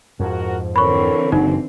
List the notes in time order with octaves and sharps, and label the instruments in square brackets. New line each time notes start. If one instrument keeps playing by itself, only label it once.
[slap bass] F2 G#2 [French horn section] F#4 A#4
[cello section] D3 E3 C4 [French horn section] A4 A#4 C#5 [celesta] B5 C#6
[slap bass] F#1 [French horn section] F#3 [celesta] D#4